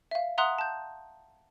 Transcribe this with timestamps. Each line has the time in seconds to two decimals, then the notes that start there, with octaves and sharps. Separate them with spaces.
0.11 E5 F5
0.38 E5 F#5 A#5 C6 D#6 F#6
0.59 A5 G6